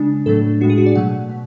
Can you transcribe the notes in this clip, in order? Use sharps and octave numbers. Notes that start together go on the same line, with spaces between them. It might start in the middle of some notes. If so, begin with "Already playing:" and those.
Already playing: C#3 G#3 D4
A2 F#3 A3 D4 A4
A2 G#3 D4 F#4
G#4
F#4
D5
B2 F#3 A3 F#5
B2